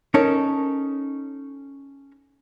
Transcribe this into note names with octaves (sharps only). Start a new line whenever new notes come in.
C#4 D#4 A4 A#4 C#5